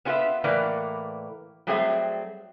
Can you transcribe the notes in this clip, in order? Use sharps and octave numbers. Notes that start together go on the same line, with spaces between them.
B3 C#4 F4 G4 B4 E5
A2 E3 A#3 B4 D5
F#3 G3 A3 C4 G#4 E5